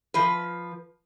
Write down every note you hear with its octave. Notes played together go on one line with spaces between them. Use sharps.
F3 B4